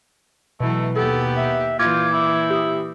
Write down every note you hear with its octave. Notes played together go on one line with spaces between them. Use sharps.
B2 E3 F#3 A3
D#2 B3 G4 A4
E5
A#2 E3 F4 D6 G6 G#6
E4
G4 D#6